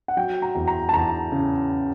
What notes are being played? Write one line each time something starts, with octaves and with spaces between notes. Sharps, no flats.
F#5
F#3 G5
A#5
E2
A#5
A5
E2 A#5
C#3